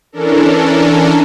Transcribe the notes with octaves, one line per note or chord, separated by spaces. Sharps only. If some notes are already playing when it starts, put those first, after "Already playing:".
E3 C#4 D4 A4 A#4